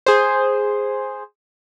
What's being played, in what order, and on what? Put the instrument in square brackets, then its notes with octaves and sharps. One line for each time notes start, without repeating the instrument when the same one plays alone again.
[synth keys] G#4 C5